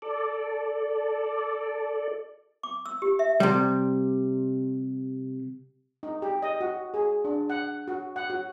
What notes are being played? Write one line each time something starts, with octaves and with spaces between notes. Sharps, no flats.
A4 D5
D6
E6
G4
E5
C3 G3
D#4
G4
D#5
F#4
G#4
D4
F#5
F#4
F#5
F#4